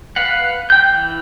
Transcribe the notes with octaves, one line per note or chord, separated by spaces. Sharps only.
B4 F5 F#5
G5 G6
E3